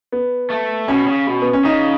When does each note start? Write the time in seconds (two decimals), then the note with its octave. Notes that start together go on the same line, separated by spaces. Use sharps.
0.12 B3
0.50 A3
0.88 B2 C#4
1.07 C#3
1.27 B2
1.42 B3
1.53 C#4
1.64 C#3 D#4